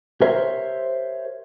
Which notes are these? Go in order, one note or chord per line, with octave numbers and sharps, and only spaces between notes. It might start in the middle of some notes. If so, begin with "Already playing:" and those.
G4 A#4 C5 C#5 E5